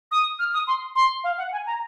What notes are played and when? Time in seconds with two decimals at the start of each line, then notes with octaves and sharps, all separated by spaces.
0.11 D#6
0.39 F6
0.54 D#6
0.67 C6
0.95 C6
1.24 F5
1.38 F#5
1.52 G#5
1.66 A#5